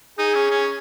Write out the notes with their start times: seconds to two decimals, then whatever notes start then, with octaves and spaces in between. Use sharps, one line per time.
0.18 D#4 G#4
0.35 C#4
0.51 C#4